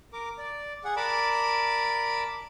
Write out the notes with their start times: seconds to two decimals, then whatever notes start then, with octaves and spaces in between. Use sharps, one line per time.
0.13 A#4 D6
0.38 D5
0.84 G#4 F#5
0.96 A#4 D5 A5 B5 D6